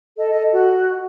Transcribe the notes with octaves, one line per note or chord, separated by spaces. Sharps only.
A4 D#5
D#5
A4
F#4